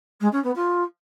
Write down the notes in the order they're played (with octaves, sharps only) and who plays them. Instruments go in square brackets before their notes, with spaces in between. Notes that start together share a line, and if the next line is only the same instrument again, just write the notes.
[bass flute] G#3
C#4
B3
F4